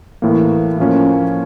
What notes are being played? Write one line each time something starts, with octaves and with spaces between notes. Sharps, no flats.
A2 E3 A#3
A2 F3 A#3 C#4 F4